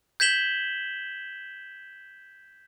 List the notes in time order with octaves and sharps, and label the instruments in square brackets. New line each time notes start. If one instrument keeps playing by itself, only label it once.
[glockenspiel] G6 G#6 B6 E7 F#7 G7